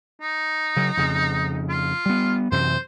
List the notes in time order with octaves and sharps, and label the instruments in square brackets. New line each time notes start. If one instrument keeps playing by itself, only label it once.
[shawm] D#4
[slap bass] C#3 F#3
F2 C#3
[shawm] F4
[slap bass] G3 B3
[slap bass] F#2 C3 E3 [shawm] C5